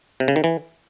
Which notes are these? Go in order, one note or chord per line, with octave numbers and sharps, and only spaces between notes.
C3
C#3
D#3
E3